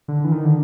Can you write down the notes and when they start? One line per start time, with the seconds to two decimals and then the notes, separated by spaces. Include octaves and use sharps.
0.08 D3
0.24 E3
0.32 D#3
0.45 D3